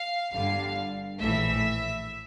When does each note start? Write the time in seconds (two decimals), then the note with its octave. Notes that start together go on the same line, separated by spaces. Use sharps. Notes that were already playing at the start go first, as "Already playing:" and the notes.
Already playing: F5
0.34 G1 G2 D3 G3 F5
1.19 A#1 A2 E3 A3 E5